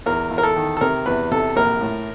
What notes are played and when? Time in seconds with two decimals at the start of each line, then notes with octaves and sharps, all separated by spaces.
0.06 E2 A#4
0.31 E2
0.38 A#4
0.43 A4
0.56 D#3
0.77 A4
0.81 C3 A#4
1.06 E2 B4
1.31 C3 A4
1.56 A#1 A#4
1.81 A2